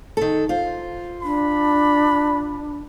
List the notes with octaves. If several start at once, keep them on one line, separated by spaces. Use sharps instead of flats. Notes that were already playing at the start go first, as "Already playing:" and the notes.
D#3 A4
F4 C5
D4 B5